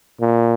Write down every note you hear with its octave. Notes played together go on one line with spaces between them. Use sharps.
A#2